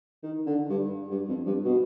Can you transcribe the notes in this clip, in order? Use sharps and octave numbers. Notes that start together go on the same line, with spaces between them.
D#3
D3
G2
G2
F2
G2
B2